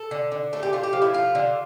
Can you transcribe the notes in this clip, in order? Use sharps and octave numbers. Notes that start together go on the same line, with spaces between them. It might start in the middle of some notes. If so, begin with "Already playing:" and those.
Already playing: A4
D3
D3
A3 A4
G4
A3 F4
G4
F3
E4
A3 F4
D3